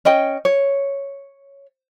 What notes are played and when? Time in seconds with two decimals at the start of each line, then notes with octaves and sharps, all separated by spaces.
0.05 C#4 D#5 G5
0.45 C#5